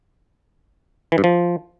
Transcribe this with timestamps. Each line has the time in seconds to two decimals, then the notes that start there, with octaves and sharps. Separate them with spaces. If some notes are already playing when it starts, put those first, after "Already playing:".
1.12 E3
1.18 G2
1.24 F3